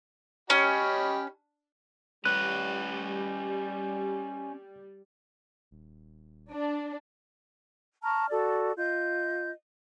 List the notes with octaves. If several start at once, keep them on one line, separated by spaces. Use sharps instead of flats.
C#4 G4 D#5 B5
G3 C#4 B4 F#6
D#1
D4
A5 A#5 C#6 F6
F#4 A4 D5
F4 D#5 G6